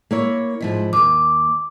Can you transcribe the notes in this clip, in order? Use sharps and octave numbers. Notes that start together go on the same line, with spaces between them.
A#3 E4 C#5
G#2 F3 E4
D#2 D6